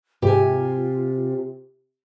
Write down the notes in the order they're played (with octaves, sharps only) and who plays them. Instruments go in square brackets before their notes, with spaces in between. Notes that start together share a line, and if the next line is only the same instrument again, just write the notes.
[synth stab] G#2 G#3 [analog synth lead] C3 [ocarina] F4 [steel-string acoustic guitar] G4 G#5